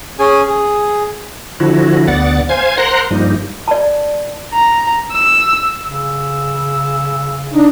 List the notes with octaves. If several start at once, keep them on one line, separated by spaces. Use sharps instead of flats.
C#4 G#4 G#5
G#4
D3 F3 E4 F#4
D2 B3 D5 F#5 A6
C5 F5 G#5 G#6
A#4 C5 F#5 A#5 C6 F#6
G2 F3 G3 A#3 D#4
D5 A5
A#5
E6
C#3 E6
D4 D#4